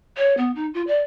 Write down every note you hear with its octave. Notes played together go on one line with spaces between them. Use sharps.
C#5
B3
D#4
F4
D5